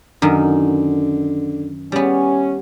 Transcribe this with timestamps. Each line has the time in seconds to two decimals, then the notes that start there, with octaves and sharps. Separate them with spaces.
0.22 F#2 D3 D#3
1.92 G3 B3 C#4